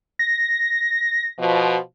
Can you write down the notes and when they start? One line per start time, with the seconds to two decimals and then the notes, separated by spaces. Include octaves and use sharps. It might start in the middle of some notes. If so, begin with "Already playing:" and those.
0.19 A#6
1.39 B2 F3